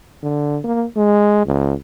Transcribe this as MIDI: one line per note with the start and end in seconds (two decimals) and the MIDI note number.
0.23 0.59 50
0.64 0.85 58
0.97 1.42 56
1.46 1.74 37